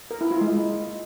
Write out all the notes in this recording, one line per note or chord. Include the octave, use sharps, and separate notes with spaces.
A#4
E4
F4
G#3